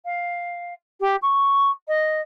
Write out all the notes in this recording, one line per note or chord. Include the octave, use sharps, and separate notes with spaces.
F5
G4
C#6
D#5